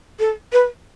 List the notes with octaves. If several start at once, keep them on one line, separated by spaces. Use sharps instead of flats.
A4
B4